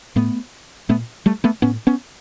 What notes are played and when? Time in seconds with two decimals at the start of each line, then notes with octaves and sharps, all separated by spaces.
0.16 A2 A3 B3
0.89 A#2 A3 B3
1.26 G3 A3
1.44 A3 B3
1.62 A2 B3 C#4
1.87 B3 C#4